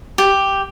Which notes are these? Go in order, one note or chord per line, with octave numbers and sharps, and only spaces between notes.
G4